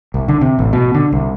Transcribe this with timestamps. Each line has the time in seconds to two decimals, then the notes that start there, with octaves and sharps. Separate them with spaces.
0.14 C2
0.28 D3
0.41 C3
0.59 A1
0.73 B2
0.94 D3
1.12 C2